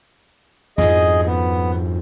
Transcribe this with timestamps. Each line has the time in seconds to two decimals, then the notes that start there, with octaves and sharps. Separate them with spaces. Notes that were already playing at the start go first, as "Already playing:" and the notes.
0.78 F2 G#2 F3 G#4 D#5
1.26 B3